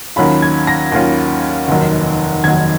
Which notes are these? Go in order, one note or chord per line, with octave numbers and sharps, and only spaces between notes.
D#2 D#3 F#3 C#4 F4 B5
G#6
A#6
D#2 D#3 F#3 C#4 F4
F1 D#2 D#3 F#3
F1 D#2 D#3 F#3 G#6